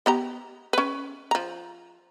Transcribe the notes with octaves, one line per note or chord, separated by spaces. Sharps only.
B3 G4 A#5
C#4 B4
F3 A#5